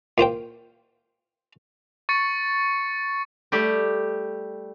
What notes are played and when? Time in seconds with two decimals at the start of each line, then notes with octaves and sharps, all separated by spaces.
0.18 A#2 F4 C5 G5
2.09 C#6 A6 C#7
3.52 G3 A3 G4